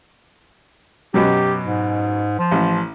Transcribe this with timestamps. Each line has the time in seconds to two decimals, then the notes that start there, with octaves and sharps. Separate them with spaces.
1.14 F#2 B2 F#3 G4
1.64 G#2
2.39 F3
2.52 A1